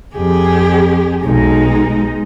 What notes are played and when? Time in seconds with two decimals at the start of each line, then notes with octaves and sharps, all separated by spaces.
0.16 F2 G4 G#4
1.24 B1 G#3 D#4